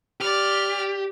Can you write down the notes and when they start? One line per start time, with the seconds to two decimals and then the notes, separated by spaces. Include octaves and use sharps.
0.20 G4 D5 F6